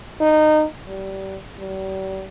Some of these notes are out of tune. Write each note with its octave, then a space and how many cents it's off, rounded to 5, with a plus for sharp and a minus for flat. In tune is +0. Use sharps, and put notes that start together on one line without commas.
D#4 -20
G3 -25
G3 -40